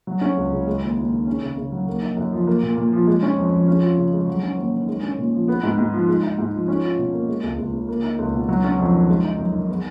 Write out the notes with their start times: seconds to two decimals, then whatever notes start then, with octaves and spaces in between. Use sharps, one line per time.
0.07 F#3
0.21 C#4
0.37 C#2
0.52 C#3
0.67 G#3
0.82 D#2
0.97 D#2
1.12 D#3
1.27 C#4
1.42 C#3
1.57 C#3
1.72 F#3
1.87 A#3
2.02 D#4
2.17 F#2
2.32 F3
2.47 A#3
2.63 A#2
2.77 A#2
2.92 F3
3.07 G#3
3.23 C#4
3.37 F2
3.52 F3
3.68 C#4
3.82 F4
3.97 C#3
4.12 G#3
4.27 F#3
4.43 C#4
4.57 D#2
4.73 D#3
4.88 G#3
5.03 C#4
5.18 A#2
5.33 F3
5.48 B3
5.63 G#2
5.78 G#2
5.93 F3
6.08 G#3
6.23 D#4
6.38 G#2
6.53 F3
6.68 C#4
6.83 F4
6.98 B2
7.13 A#3
7.29 G#3
7.43 C#2
7.58 C#2
7.73 C#3
7.89 A#3
8.03 D#4
8.18 C#2
8.33 B2
8.49 F#3
8.64 C#4
8.79 F2
8.94 D#3
9.09 G#3
9.24 D#4
9.39 F#2
9.53 D#3
9.69 B3